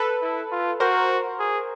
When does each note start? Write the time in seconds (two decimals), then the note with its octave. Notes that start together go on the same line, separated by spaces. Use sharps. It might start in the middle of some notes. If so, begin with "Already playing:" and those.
Already playing: A4 B4
0.22 E4
0.52 F4
0.80 F#4 A#4 C5
1.39 G#4